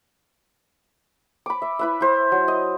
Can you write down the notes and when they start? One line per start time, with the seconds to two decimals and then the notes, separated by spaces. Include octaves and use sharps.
1.46 B5 D6
1.62 E5
1.79 E4 B4 E5
2.01 E4 C5
2.32 F#3
2.48 D#5